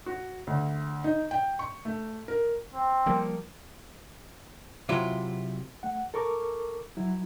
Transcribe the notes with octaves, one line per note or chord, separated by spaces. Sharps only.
F#4
D2
D#4
G5
C#6
A3
A#4
C4
F3 G3 A#3
C3 F#3 E4 F4
A3 F#5
A4 A#4 C#6 D6
F#3 E4